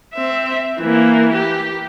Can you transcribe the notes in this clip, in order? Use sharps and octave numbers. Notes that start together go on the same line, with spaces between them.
C4 E5
E3 A#3
G4